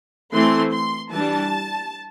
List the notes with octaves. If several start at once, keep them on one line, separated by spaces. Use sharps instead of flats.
E3 A3 C4 C6
C6
E3 G3 D4 A5